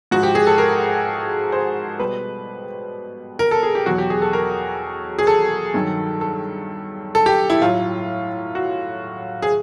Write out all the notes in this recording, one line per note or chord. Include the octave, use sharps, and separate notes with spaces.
G#2 F3 F#4
G4
G#4
A4
A#4
C5
B2 G3 B4
A#4
A4
G#4
G4
E2 B2 F#3 F#4
G4
G#4
A4
A#4
G#4
A4
G2 D#3 F#3
A4
A4
G4
E4
A2 F#3 F4
F#4
G#4